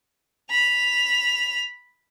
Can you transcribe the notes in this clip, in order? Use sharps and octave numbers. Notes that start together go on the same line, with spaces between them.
B5 F7